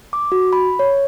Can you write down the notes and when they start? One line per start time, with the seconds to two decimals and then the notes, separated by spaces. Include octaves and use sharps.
0.13 D6
0.32 F#4
0.53 B5
0.79 C#5